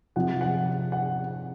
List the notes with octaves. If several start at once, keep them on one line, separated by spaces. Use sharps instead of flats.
C3 F3 F#5
F#5
F#5